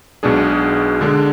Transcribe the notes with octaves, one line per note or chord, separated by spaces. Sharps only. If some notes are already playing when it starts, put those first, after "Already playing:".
B1 B2 G#3 D4 G#4
D3 G#3 D4